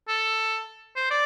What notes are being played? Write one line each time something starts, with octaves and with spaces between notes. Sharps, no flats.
A4
C5
D5